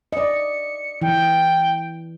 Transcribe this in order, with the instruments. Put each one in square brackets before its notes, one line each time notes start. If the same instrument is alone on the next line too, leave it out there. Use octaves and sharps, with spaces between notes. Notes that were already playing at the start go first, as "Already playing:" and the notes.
[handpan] D5 D#5 [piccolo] C#7
[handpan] E3 [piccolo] G5